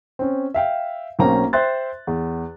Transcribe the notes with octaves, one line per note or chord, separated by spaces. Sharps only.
C4 C#4
E5 F5 G5
B1 A#3 C4 C#4 A#5
C5 E5 G5 C6 F#6 A6
E2